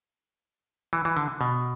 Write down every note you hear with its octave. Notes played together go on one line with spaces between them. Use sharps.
E3
E3
D3
B2